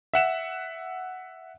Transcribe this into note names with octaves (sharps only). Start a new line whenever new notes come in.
E5 F#5 E7